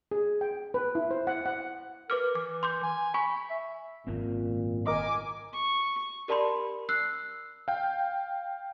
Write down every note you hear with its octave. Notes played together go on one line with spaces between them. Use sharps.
G#4
G5
B4
E4
C5
F#5
F#5
A#4 B4 D6 F6
E3 D6
C6 D6 G6
G#5
G#5 B5 C#6
E5
G#1 F#2 A#2 C4
A#4 D#5 G#5 D6
C#6
G4 A#4 D5 A5 B5 C6
E6 F#6 C7
F5 G5